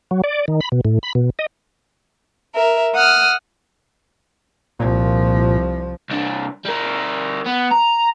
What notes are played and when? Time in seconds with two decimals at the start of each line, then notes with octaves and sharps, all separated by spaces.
0.11 F#3
0.24 D5
0.48 D#3
0.61 B5
0.72 B2
0.85 A2
1.03 B5
1.15 B2
1.39 D#5
2.55 A#4 E5
2.95 F#5 D#6 F6
4.80 C2 A#2 F3
6.10 C2 D4
6.65 G3 A#4
7.46 B3
7.71 A#5